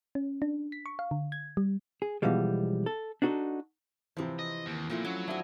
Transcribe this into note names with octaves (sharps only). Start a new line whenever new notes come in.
C#4
D4
B6
C#6
F5
D3
G#6
G3
G#4
B2 E3 F3 G3 G#3
A4
D4 D#4 F#4 G#4 A4
C3 E3 F3 C4
D#5
D#2
A#2 F3 A3 E4
F#3 C#4 D6
F3 D4 E4 F#4 G#5